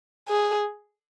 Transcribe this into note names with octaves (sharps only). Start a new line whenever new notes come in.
G#4